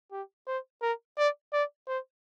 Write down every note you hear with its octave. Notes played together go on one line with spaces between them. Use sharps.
G4
C5
A#4
D5
D5
C5